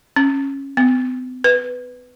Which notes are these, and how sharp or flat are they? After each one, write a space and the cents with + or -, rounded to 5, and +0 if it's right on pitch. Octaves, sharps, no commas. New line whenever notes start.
C#4 -15
B3 +45
B4 +5